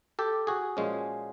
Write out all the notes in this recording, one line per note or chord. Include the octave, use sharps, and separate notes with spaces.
G4 A4
F#4 G#4
A#2 F3 G#3 C#4